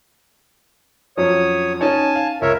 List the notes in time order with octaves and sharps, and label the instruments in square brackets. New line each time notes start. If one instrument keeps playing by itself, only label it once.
[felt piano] F2 F#3 C#4 [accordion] C#5 D#6
[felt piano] C#4 D#4 C#5 [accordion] G#5 A5
[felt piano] F5
[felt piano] C#2 [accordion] A#4 C#5 E5